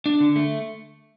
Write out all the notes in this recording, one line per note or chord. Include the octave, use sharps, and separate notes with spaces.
D4
D3
A3